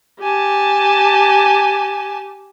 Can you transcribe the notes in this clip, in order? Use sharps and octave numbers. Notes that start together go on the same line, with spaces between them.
G4 G#5 A5